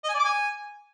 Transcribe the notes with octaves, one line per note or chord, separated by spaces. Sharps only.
D#5
G#5
D5
D6
G#5